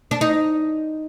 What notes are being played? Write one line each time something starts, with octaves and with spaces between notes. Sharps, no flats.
D4
D#4